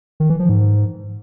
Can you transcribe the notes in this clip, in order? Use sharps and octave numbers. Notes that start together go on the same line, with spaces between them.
D#3
E3
F3
G#2